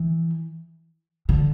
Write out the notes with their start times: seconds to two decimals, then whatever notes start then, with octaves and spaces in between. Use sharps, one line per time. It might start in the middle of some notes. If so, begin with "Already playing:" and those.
Already playing: E3
1.29 D3